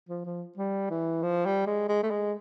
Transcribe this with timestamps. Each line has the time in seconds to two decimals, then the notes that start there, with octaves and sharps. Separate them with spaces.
0.09 F3
0.25 F3
0.57 G3
0.90 E3
1.22 F3
1.45 G3
1.66 G#3
1.89 G#3
2.03 A3
2.10 G#3